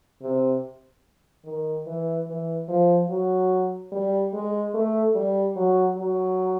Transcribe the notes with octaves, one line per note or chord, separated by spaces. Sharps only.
C3
D#3
E3
E3
F3
F#3
G3
G#3
A3
G3
F#3
F#3